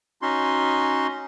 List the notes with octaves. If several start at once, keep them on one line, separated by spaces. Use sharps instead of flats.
C#4 D#4 F#4 C6